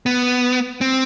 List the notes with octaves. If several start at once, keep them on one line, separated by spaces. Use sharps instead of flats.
B3
C4